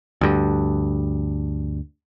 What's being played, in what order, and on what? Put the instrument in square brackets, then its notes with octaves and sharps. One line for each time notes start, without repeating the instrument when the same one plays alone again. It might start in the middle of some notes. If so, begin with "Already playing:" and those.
[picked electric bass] D2 G2